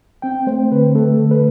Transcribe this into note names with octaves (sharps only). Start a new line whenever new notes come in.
C4 G5
A3 C5
D3 B4
A3 A4
D3
B4